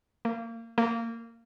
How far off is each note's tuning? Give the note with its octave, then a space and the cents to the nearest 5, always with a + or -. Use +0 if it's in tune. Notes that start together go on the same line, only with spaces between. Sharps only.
A#3 -30
A#3 -20